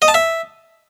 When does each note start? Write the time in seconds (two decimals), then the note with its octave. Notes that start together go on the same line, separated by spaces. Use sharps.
0.02 D#5
0.08 A5
0.14 E5